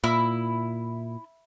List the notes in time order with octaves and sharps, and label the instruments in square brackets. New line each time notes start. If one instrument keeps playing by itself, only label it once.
[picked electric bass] A#2 [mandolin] E4